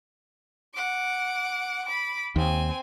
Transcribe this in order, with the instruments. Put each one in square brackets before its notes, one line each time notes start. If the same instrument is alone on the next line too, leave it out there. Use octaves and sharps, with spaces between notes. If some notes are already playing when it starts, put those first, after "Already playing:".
[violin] F#5 D6
B5 D6
[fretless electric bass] D#2 [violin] C4 G#5